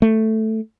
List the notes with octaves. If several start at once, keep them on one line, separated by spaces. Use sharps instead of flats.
A3